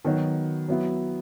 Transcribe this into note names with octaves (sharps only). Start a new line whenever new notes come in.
D#3 F#3 B3 F#4 C#5
F#3 B3 E4